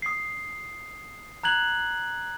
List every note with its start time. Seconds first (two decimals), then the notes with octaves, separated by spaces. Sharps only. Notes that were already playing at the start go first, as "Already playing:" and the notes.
0.02 D#6 C7
1.43 A#5 F#6 G#6 F#7